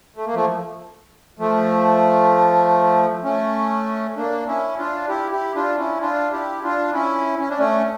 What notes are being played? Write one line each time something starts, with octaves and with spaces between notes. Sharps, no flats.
A3
A#3
F3 A3
F3 A3
A3 C#4
A#3 D4
C#4 E4
D4 F4
E4 G4
E4 G4
D4 F4
C#4 E4
D4 F4
E4 G4
D4 F4
C#4 E4
C#4
D4
A3 C#4